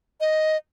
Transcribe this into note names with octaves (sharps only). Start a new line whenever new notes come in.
D#5